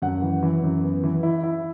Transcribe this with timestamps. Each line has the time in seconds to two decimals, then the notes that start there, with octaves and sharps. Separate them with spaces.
0.02 F#2 F#5
0.22 E3
0.43 E3
0.63 F#2
0.83 B3
1.03 E3
1.23 E4
1.43 E4